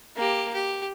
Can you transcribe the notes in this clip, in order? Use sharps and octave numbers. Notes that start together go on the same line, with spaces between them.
A#3 G4
G4